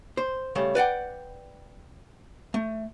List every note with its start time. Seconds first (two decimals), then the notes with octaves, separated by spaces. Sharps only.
0.17 C5
0.55 C#3 G3 A3
0.75 B4 D5 F#5 G5
2.54 A3